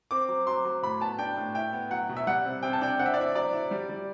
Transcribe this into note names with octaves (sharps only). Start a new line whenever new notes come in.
C4 D6
F#3
F#3 C6
F#3
A2 B5
B3 A5
D4 G5
A2
E4 G5
B3
F#3 F#5
B2
E5
G3 F#5
C3
C3 G5
A5
D4 G5
C4 F#5
E5
D5
E4 E5
F#3 D5
E4
G3
G3